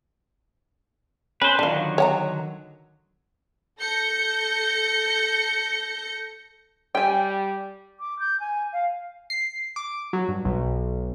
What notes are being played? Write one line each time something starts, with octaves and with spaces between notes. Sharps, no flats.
C#4 B4 C5
D3 D#3 F#3 D4 F4
C#5 F#5 A#5
A4 G6 A#6 C#7
G3 G5 G#5
D6
G6
G#5
F5
C7
D6
F#3
G2
B1